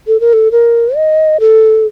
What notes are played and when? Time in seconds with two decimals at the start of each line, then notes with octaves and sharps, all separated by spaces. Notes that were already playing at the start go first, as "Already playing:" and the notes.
0.07 A4
0.20 A#4
0.33 A4
0.51 A#4
0.96 D#5
1.40 A4